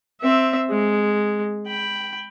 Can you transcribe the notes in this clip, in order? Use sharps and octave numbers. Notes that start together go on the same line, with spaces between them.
C4 E5
G#3
G5 B5